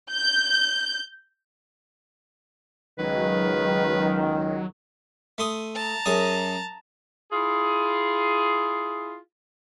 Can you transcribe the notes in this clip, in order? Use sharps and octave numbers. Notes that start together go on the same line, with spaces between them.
G6
C#2 D#3 F#3 B4
A3 C6 D#6
A5 A#5
F#2 G#4 D#6
E4 F4 G#4